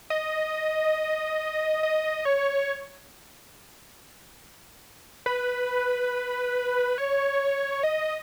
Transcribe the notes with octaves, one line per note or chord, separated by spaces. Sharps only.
D#5
D#5
C#5
B4
C#5
D#5